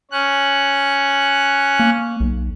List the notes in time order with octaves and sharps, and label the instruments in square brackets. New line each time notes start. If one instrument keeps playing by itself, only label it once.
[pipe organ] C#4 F#6
[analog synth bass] A#3
B1